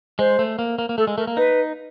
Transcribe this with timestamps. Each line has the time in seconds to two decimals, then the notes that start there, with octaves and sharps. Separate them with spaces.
0.19 G#3 C5
0.39 A3
0.59 A#3
0.79 A#3
0.89 A#3
0.97 A3 A4
1.07 G#3
1.17 A3 A#4
1.27 A#3
1.36 D#4 B4